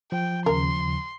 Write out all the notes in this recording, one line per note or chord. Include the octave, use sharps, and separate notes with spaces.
F3 G5
D#2 C#3 A#4 C6